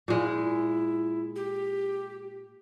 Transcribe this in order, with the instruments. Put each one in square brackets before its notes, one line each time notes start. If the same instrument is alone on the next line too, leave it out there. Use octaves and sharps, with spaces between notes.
[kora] A#2 G#3 [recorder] E4
[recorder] G4